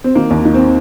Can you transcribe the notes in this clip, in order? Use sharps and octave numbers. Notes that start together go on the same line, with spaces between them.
C4
D#3 A#3
D#2
D#3
C4